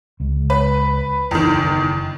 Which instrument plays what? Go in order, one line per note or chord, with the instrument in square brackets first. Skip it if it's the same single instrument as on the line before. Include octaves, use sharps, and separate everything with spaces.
[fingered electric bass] C#2 G#3
[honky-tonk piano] B4
[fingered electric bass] F#1 [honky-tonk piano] E2 D#3